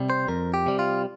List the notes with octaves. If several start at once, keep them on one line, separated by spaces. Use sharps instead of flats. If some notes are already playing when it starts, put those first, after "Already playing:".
Already playing: C3 G3
C5
F2 A#4
G4
C3 G3
F4